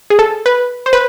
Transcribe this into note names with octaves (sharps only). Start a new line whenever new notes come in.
G#4
A4
B4
C5
B4